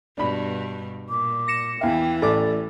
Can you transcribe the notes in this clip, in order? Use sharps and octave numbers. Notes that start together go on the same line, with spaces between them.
G2 B2 D4 B5
A#2 D6
A#6 C#7 E7
E2 E3 E5 F5 G5
A1 A4 D5 D6